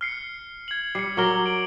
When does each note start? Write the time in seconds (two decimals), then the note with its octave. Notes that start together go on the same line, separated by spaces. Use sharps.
0.01 F6 C7 C#7
0.68 G#6 F#7
0.95 G3 C7 C#7
1.17 F#3 A#4 D6 G7
1.46 D7 F#7